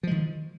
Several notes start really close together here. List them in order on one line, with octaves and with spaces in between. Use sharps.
F3 G#3 D#3